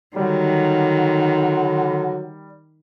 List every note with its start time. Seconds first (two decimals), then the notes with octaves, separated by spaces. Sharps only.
0.16 D3 D#3 F#3 G3